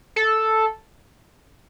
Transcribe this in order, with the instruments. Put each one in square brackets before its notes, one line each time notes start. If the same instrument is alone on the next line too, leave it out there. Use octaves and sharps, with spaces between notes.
[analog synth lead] A4